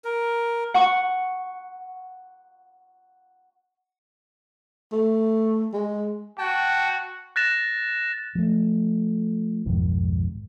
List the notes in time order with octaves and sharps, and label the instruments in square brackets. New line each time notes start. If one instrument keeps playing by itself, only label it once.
[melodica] A#4
[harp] F#5 C#6
[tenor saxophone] A3
G#3
[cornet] F#4 [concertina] G5 A5
[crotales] F#6 A6 A#6 E7
[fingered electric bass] F3 A3
B1 F2 G#2 D#3